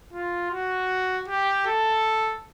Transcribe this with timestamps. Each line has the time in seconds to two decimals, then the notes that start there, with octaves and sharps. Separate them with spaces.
0.13 F4
0.51 F#4
1.28 G4
1.66 A4